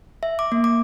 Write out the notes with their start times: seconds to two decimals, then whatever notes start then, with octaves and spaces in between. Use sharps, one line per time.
0.23 E5
0.39 D6
0.52 A#3
0.64 D6